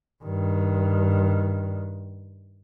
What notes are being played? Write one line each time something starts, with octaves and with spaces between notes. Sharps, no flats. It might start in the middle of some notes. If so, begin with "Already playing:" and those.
G2 D#3